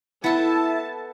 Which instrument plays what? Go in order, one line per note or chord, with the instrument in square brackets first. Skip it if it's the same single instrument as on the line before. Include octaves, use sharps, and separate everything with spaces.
[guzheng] B3 A4 [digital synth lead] E4 [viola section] A5